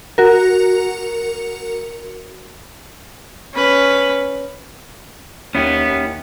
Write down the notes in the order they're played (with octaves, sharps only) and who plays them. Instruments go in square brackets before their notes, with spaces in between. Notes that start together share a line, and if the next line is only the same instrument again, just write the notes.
[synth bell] F#4 A#4
[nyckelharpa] C#4 B4
[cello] D#2 [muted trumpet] B3 [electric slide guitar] C#4 E4 G4